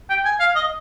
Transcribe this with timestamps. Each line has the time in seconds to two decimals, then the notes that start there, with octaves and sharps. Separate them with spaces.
0.10 G5
0.25 G#5
0.40 F5
0.56 D#5